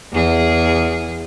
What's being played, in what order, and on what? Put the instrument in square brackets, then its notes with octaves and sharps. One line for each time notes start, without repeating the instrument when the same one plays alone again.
[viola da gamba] E2 G#4